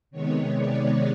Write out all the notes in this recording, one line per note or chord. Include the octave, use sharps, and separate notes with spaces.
C3 D#3 G#3 B3 C#5
D5